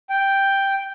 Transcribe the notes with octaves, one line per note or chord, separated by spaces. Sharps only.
G5